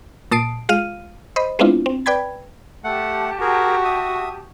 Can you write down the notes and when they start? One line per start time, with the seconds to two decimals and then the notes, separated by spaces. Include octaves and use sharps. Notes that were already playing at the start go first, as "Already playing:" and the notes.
0.31 A#2 A5 D#6 C7 D7
0.69 G#3 F4 F5 F6 D#7
1.36 C5 D#5 B5
1.59 G#3 B3 C4 D4 E4 F4
1.86 C4
2.06 B4 D5 G5 B5 G#6
2.84 A3 G4 F#5 A5
3.41 F#4 G#4 A#4
3.84 E5 D#6